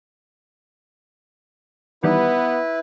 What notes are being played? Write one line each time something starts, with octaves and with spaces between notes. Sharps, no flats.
D#3 E3 G3 B3 E4 B4